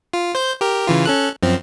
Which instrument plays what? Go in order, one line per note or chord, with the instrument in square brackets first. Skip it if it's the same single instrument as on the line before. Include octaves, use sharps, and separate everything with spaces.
[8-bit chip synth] F4
C5 G6
G4 A#4
C#3 E3 F4
C#4 A4 F#6
F#2 F3 C4